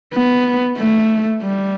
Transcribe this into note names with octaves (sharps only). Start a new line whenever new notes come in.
B3
A3
G3